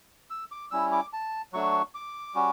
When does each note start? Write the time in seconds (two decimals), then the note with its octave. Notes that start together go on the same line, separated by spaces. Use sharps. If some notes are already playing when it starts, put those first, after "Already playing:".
0.30 E6
0.52 D6
0.71 G3 C#4 E4 E6
0.92 D6
1.13 A5
1.53 F#3 A3 D4 F#4 C#6
1.95 D6
2.35 G3 C#4 F#4